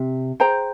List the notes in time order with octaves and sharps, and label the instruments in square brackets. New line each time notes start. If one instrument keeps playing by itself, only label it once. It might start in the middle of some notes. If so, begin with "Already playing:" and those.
Already playing: [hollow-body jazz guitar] C3
[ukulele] G#4 C5 G5 A#5